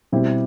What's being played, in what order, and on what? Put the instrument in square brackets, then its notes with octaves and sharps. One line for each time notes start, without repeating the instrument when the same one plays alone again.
[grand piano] B2 G3 C4 E4 G4